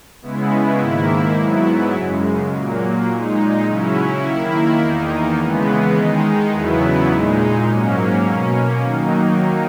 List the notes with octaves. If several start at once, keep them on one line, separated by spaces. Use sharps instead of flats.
C#3 G#3 B3 E4
G#2 D#3 A#3 E4
G#2 F#3 B3 E4
F#2 C#3 G#3
A#2 F#3 A#3
A#2 G#3 D#4
C#3 F#3 C#4 E4
D#3 A#3 E4
E2 D#3 A#3 D#4
C#3 E3 G#3 B3
D#3 G#3 D#4
E2 C#3 F#3 B3 E4
A#2 G#3 D#4
G#2 F#3 A#3 C#4
B2 A#3 C#4
D#3 F#3 A#3 D#4